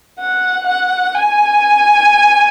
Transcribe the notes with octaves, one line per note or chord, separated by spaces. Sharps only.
F#5
F#5
G#5